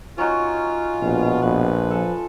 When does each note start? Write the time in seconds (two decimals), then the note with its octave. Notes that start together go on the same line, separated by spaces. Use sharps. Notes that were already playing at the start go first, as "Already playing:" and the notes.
0.18 C#4 D#4 F4 F#4
1.02 A#1 B2
1.42 A#1 F3 B4
1.91 F3 A4 G#5